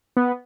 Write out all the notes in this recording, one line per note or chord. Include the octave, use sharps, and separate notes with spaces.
B3